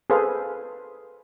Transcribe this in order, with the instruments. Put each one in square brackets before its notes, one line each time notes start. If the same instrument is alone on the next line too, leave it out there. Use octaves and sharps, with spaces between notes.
[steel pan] G#4 A4 B4 C5 F5